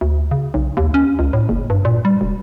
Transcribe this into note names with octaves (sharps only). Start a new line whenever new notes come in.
D2
C#3
B1
D#2
C#4
C#2
A2
F#1
G2
A#2
G3
E1